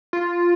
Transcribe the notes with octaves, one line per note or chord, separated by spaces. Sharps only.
F4